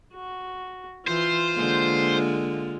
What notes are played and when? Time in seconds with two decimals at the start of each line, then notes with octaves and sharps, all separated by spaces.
0.13 F#4
1.07 E3 F4 C5
1.54 D3 G#3 A#3